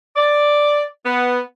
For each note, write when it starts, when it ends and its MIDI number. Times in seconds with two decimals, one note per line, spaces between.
0.16 0.82 74
1.06 1.39 59